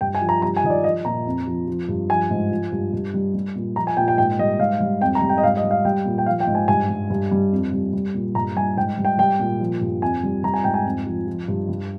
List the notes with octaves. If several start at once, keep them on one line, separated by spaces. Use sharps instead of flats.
G2 G5
G#5
F3
A#5
G3 A#5
G#5
D#3 D#5
D5
F3 D#5
A#2 A#5
F2
F3
F3
G2
F3 G#5
G#2
F3
G2
G2
G3
G3
A#2
F3 A#5
G#5
A#2 G5
G5
G#2 G5
G3 D#5
G#2 F5
G3
F2 G5
A#5
G3
G5
D#5
G#2 F5
D#5
G3
F5
G3 G5
A#2
G5
F3 F5
G5
G#2
G#5
G2 G#5
G3
G2
G3
F2
G3
G3
A#2
G2 A#5
G3 G#5
G#2 G5
G3
G5
G3 G5
A#2
F3
G2
F2 G#5
G3
G3 A#5
G#5
G#2 G5
G#5
F2
F3
F3
G2
G3